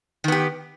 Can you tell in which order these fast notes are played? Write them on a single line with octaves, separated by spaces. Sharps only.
D#3 B3 G4